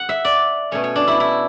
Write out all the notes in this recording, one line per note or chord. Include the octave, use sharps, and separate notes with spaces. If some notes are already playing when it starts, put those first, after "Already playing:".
Already playing: F#5
E5
D5
B2 A3 C#4 C#5
C#5
D4
E4
E4